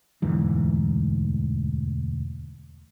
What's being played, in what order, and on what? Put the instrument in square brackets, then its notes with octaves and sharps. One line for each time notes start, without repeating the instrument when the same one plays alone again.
[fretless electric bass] E1 D2 G#2 E3